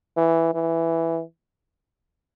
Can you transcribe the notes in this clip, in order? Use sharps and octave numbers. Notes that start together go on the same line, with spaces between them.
E3
E3